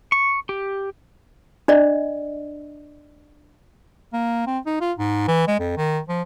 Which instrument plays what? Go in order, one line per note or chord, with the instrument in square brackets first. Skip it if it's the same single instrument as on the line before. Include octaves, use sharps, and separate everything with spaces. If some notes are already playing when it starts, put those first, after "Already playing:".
[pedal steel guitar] C#6
G4
[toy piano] D4 D5 D#5
[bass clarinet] A#3
C4
D#4
F4
G#2
E3
G#3
F2
D#3
F3